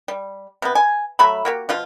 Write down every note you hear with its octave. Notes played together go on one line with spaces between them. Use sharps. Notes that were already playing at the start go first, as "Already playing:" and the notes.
G3
C3 B3
G#5
F#3 A3 E5 B5
A#3 F#4 G4
B2 F3 F4